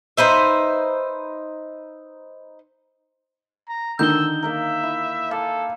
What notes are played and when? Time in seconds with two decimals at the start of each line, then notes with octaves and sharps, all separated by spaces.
0.17 D#4 B4 C5 E5
3.69 A#5
3.99 D3 D#3 D#4 E6 G6 G7
4.43 A#3 D#4 A#4 E5
4.83 E4
5.31 A4 D5 F5 G#5